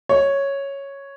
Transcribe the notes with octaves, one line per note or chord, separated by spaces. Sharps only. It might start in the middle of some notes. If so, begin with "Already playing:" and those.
C#5